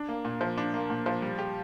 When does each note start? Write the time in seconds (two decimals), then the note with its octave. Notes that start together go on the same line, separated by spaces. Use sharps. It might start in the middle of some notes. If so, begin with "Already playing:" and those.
Already playing: D4
0.09 A#3
0.25 A#2
0.41 F3
0.58 D4
0.74 A#3
0.90 A#2
1.06 F3
1.22 G3
1.39 G4